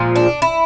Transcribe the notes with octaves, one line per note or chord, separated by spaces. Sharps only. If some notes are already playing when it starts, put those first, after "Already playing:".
Already playing: A#2 F3 G#3
D4
E4